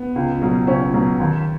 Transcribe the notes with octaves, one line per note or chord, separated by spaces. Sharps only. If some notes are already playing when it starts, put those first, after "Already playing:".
Already playing: B3
C#2
B2 F#3
C#2 C#4
B2 F#3
D#2